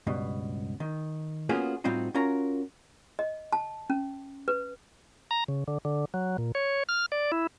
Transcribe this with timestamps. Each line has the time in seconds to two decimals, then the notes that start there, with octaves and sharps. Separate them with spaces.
0.07 C#2 G2 B2
0.80 D#3
1.49 A#3 B3 C#4 F4 F#4 G#4
1.84 A2 G3 C4 D#4 F4 F#4
2.14 C#4 F4 F#4 A#4 A#5
3.19 D#5
3.52 A5
3.90 C#4
4.48 B4
5.31 A#5
5.48 C#3
5.68 D3
5.85 D3
6.14 F#3
6.38 A#2
6.55 C#5
6.89 F6
7.12 D5
7.32 E4